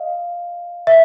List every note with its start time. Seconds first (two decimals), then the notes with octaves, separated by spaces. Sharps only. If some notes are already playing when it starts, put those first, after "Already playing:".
Already playing: D#5 F5
0.87 E5